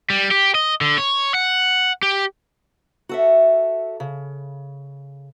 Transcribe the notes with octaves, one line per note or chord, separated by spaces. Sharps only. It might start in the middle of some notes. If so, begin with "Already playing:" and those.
G3
G4
D#5
D3
C#5
F#5
G4
F#4 A4 E5
C#3